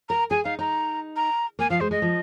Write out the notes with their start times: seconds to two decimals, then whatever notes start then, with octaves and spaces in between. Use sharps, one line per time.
0.09 A#4 A#5
0.31 G#4 G#5
0.44 D#4 F5
0.59 D#4 A#5
1.16 A#5
1.59 A#3 G#5
1.70 F3 F5
1.80 G#3 C5
1.91 G#3 D#5
2.02 F3